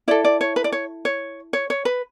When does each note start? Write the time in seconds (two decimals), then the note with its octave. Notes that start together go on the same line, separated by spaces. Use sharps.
0.08 E4 A4 D5
0.24 D5
0.41 C#5
0.56 B4
0.64 D5
0.72 C#5
1.05 C#5
1.53 C#5
1.70 C#5
1.85 B4